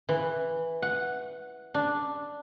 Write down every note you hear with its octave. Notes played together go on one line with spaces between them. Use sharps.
E3
F#5
D4